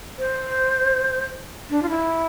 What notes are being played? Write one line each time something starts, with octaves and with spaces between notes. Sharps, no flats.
C5
D4
F4
E4